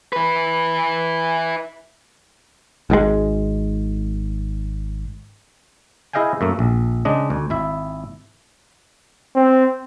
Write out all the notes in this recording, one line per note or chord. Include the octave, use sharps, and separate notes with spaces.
E4 B4
G#1 G#2 D#3 G#3
E4 G#4 D#5 F5 G5 G#5
F#2 A3 A#3
A#1
C#3 G#3 D4 D#5
D2
G#1 E4 E5
C4